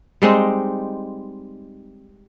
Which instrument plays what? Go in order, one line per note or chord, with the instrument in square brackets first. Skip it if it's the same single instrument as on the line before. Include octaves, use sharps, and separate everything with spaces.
[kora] G3 G#3 C4 D#4